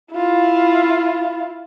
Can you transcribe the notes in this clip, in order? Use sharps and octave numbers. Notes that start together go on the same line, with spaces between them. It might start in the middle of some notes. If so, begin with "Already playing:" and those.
E4 F4